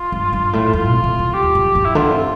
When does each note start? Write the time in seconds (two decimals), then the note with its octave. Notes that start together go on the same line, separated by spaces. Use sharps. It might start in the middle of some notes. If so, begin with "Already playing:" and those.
Already playing: F4
0.12 G2
0.33 G2
0.53 A2
0.73 F2 F4
0.89 C3
1.04 C3
1.19 E3
1.34 G4
1.43 E2
1.55 F2
1.75 G2
1.85 E4
1.95 D3 F4
2.11 C3